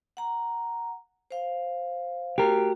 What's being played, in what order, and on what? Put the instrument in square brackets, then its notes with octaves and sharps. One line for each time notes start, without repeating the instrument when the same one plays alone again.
[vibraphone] F#5 A#5
C5 F5
[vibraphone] A3 F#4 [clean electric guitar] G4 A#4